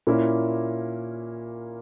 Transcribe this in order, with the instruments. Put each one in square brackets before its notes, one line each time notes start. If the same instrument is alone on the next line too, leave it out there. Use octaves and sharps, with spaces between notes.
[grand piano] A#2 A#3 C#4 E4